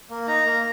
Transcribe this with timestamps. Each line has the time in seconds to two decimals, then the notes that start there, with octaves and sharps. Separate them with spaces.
0.10 A#3
0.27 D#4 A#5
0.45 A#3